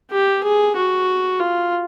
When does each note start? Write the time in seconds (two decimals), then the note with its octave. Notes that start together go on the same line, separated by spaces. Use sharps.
0.11 G4
0.44 G#4
0.76 F#4
1.39 F4